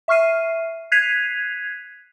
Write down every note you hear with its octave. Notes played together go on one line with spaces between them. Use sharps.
E5 C#6 F6 C7 D#7
F#6 G#6 B6 C7 D#7 F7